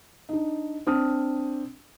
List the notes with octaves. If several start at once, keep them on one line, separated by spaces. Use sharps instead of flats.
D4 D#4
C4 D4 D#6 F6